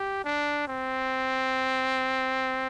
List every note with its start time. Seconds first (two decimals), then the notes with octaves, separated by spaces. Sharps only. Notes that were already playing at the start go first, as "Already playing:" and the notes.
Already playing: G4
0.24 D4
0.67 C4